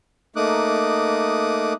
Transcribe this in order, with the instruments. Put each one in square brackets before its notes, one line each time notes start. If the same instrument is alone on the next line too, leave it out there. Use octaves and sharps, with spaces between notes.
[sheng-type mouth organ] A3 A#3 D#4 D6 D#6 F#6